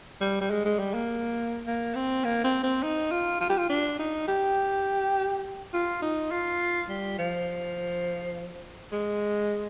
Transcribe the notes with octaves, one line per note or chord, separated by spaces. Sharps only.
G3
G3
G#3
G#3
G3
A#3
A#3
C4
A#3
C4
C4
D#4
F4
F4
G4
F4
D4
D#4
G4
F4
D#4
F4
G3
F3
G#3